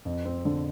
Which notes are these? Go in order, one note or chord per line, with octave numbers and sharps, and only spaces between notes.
F2
C4
D3